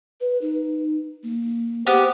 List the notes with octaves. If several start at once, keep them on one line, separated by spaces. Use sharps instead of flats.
B4
D#4
A#3
B3 G4 C5